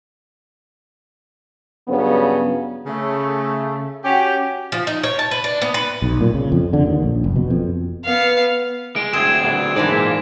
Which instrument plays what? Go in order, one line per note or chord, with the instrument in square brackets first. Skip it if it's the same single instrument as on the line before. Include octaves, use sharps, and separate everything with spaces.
[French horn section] G2 C#3 F#3 B3
[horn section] C#3 A3
C#4 F#4 G4
[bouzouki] F3
D#4
C#5
A5
B4
D4
B3
B4
[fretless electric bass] B1
A#2
C#3
F2
D3
D#2
A#1
F#1
B2
F2
[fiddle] B3 F5
[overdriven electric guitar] G#3 [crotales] D7
[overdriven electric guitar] D2 C4 [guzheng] G#4 [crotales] G#6 D7 E7
[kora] B3 D4
[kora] G#2 D4 A#4 [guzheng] E3 G#3 B4 [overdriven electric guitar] D5
[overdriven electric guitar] A#2 [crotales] B6